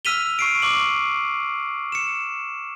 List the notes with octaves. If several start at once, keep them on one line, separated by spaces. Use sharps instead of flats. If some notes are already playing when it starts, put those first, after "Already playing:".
E6 F6 B6 D#7 F7 G7
C#6 C7 D7
C#6 D6 F#7
C#7 E7